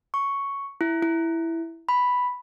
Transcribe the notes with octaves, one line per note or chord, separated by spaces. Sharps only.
C#6
E4
E4
B5